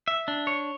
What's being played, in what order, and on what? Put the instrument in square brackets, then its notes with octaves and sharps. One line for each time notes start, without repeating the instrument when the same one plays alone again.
[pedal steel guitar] E5
D4
C#5